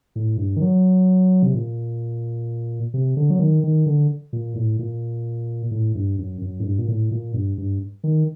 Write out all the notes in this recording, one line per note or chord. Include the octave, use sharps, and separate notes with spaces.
A2
G2
D#3
F#3
C3
A#2
C3
D3
F#3
D#3
D#3
D3
A#2
A2
A#2
A2
G2
F#2
F#2
A2
G2
A#2
A2
A#2
G2
G2
D#3